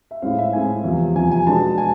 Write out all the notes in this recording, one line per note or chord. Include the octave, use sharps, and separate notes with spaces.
E5
A2 G#3 C4 F5
E5
A2 G#3 C4 G#5
E2 C3 F3
E2 C3 F3 G#5
G#5
B2 G#3 B3 D4 A5
B2 G#5